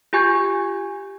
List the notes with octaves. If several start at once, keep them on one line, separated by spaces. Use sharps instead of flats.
F4 G4 G#5 C#6 G6 G#6